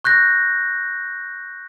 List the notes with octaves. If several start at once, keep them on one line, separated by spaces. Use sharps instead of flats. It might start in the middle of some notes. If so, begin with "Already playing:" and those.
C#6 F#6 G6 A#6